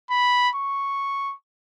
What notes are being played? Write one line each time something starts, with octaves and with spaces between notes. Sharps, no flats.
B5
C#6